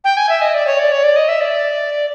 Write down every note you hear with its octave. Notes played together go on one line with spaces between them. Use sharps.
G5
G#5
E5
D#5
D5
C#5
D5
C#5
D5
D#5
E5
D5